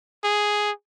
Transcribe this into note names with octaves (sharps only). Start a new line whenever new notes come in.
G#4